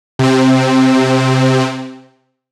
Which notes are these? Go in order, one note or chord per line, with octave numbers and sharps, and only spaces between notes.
C3 C4